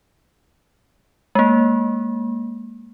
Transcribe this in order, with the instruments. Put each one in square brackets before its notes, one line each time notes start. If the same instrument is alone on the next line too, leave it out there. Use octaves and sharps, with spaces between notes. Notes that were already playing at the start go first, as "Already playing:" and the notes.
[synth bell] G#3 A#3